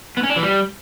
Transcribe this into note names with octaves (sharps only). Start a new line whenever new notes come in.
B3
C#4
D4
E3
G3